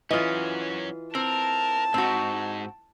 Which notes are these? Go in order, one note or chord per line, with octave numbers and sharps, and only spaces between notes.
E3 F#3 C#4 F4 D#5
C4 A#4 A5
G#2 C4 D#4 F#4